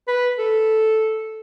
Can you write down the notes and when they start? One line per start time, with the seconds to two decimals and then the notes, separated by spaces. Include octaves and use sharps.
0.08 B4
0.38 A4